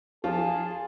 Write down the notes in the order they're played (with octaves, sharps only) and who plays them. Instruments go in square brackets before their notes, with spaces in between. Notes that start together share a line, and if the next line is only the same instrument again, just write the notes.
[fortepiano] F3 F4 [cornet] G#4 [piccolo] A5